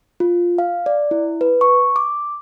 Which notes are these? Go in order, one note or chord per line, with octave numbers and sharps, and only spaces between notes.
F4
F5
D5
E4
B4
C#6
D6